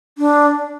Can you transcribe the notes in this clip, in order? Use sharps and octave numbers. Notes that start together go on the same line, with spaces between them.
D4